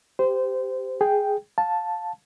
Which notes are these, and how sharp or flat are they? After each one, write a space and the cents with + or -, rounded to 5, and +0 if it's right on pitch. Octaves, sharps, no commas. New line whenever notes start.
G4 +0 C5 -20
G#4 +0 G5 +0
F5 +15 A5 +0